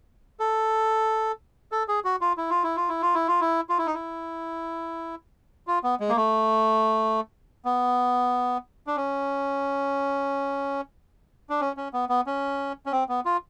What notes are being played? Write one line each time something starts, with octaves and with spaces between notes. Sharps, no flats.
A4
A4
G#4
F#4
F4
E4
F4
E4
F4
E4
F4
E4
F4
E4
F4
E4
D#4
E4
F4
B3
G#3
A#3
A3
B3
D4
C#4
D4
C#4
C#4
B3
B3
C#4
C#4
C4
B3
F4